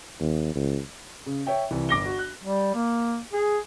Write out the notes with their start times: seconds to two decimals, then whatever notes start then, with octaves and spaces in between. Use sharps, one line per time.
0.20 D#2
0.55 C#2
1.26 C#3
1.47 C#5 E5 G5
1.71 C2 E3
1.89 G1 D6 A#6 G7
2.05 F#4
2.19 F#6
2.44 G3
2.75 A#3
3.33 G#4